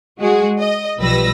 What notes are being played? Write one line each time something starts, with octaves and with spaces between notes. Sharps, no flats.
G#3 F#4 G#4
D#5
B1 F3 G3 B4 E6 A#6